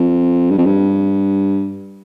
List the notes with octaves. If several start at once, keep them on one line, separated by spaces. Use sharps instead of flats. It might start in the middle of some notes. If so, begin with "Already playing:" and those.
Already playing: F2
G2
F2
G2